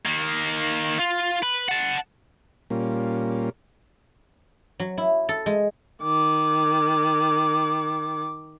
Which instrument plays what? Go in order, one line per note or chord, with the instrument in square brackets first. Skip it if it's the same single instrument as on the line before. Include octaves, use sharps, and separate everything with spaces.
[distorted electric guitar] D#3 A#3
F4
B4
F#5 A5
[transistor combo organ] A#2 G3 A#3 C#4 F4
[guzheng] F#3
E4
A4
G#3
[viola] D#3 D6